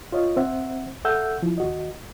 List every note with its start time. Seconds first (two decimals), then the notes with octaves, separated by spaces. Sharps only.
0.12 F4 C#5 D#5
0.36 C4 C5 E5 F#5
1.05 A4 E5 F#5 E6 G6
1.42 F3 E4
1.58 D#2 F#4 D#5